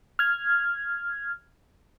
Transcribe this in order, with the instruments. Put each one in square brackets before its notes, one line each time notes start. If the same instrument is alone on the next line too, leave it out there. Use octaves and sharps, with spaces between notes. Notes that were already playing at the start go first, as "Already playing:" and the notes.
[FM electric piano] F6 G#6